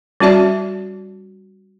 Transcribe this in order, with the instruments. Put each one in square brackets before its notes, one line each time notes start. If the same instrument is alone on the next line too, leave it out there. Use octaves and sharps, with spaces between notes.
[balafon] G3 C#4 F#4 D5 E5 A5